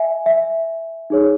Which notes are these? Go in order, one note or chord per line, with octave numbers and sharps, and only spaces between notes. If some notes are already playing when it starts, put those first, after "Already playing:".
Already playing: E5 G#5
E5
D#4 G#4 C#5